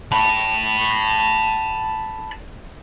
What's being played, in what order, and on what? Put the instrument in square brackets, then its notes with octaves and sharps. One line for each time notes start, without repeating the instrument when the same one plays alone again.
[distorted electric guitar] A5 B5